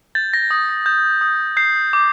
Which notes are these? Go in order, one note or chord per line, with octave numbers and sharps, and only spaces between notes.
G6 A6
A#6
D#6
A#6
G6
D#6
G6 C7
D6